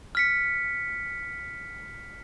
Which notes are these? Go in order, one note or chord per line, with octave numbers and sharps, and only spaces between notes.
F6 B6 C#7